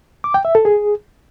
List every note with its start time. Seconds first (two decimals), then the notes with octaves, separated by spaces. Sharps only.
0.24 D6
0.34 G5
0.45 E5
0.55 A4
0.65 G#4